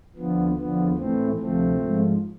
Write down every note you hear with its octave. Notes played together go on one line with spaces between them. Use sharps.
D2 D3 F3 B3
E2 D3 F3 B3
A2 E3 A3 C4
D2 C3 F3 A3 C4
G#2 F3